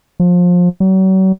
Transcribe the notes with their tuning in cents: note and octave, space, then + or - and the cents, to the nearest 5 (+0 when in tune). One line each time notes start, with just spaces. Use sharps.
F3 +25
F#3 +40